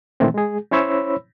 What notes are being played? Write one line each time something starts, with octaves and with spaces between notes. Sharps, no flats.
A#2 D#3 E3 A3 C4
G#3 G#4
C#4 E4 C5 C#5 B5 E6